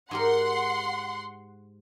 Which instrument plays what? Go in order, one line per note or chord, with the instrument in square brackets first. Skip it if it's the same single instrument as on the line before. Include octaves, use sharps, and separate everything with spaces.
[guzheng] G#2 G4 A#4 [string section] F#5 C6